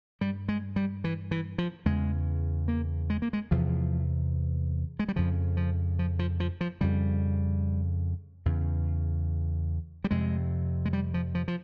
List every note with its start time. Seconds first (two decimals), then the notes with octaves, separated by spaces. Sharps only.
0.21 G2 G3
0.49 G#3
0.76 G3
1.04 E3
1.31 E3
1.58 F3
1.85 E2 C#3 G#3
2.68 A#3
3.10 G#3
3.22 A#3
3.33 G#3
3.51 E2 C3 F3
4.99 G#3
5.08 G3
5.16 F2 C#3 F3
5.57 F3
5.99 F3
6.19 F3
6.40 F3
6.61 F3
6.81 F2 C#3 G3
8.45 E2 C#3
10.04 G3
10.11 F2 C3 G#3
10.85 G#3
10.93 G3
11.14 F3
11.35 F3
11.48 F3